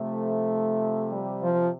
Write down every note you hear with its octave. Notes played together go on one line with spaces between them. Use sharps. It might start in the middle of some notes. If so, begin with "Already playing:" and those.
Already playing: C3 F3 A3
G3
F3